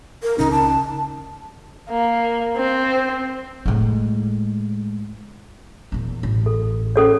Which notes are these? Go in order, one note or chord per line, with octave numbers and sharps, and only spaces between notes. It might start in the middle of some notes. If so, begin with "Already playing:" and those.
A#4
C#2 C#3 C#4 D#4
A5
A#3
C4
A2 G#3
E2 A#2
A1
A4
C#4 A4 C#5